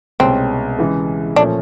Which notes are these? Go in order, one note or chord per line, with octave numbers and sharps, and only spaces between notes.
C2 B2 G#3 C4 C#4
C#3 E3 G#3
A#2 F3 A3 C#4 D4